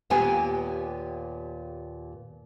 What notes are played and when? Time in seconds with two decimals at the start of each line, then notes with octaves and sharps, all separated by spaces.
0.10 D#2 A#2 A#3 B3 G4 G#5